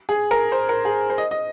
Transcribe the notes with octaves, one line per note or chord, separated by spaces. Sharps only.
G#4
A#4
C5
A#4
G#4
C5
D#5
D#5